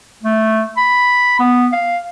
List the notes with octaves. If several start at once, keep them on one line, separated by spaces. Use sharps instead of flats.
A3
B5
B3
F5